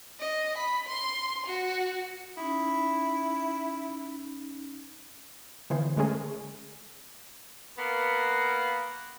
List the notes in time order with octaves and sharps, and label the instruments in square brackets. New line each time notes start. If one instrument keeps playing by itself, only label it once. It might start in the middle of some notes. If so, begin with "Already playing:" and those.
[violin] D#5
B5
C6
F#4
[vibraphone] C#4 D#4 [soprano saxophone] E4
[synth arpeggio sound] D3 E3 B3 F4 G#4 C5
D3 G#3 A3 C#4 G#4 A#4
[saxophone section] A#3 B3